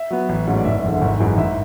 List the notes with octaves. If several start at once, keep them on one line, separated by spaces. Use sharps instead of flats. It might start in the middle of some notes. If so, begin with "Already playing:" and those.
Already playing: E5
F#3 B3
A1
G#2 F#3 A3 C#4
D5
F#1 E5
E2 D3
G#1
F#2 E3 G#3
G#1 E5